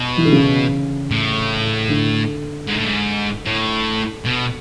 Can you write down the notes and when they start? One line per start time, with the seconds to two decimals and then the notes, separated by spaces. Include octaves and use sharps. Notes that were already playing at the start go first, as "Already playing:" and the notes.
Already playing: B2
0.17 E3
0.25 D3
0.32 C#3
1.11 A2
1.89 D3
2.68 G#2
2.77 A2
2.85 G#2
3.46 A2
4.26 B2